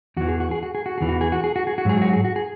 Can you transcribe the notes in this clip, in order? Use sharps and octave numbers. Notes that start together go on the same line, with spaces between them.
E2 E3 F#4
G#4
F#4
G#4
F#4
G#4
F#4
E2 E3 G#4
F#4
G#4
F#4
G#4
F#4
G#4
F#4
G#2 F#3 G#4
F#4
G#4
F#4
G#4